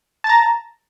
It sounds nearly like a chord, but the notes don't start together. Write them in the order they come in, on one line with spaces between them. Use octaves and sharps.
A5 A6 A#5